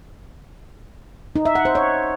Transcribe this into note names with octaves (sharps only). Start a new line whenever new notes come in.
D#4
E5
F#5
C5
C#5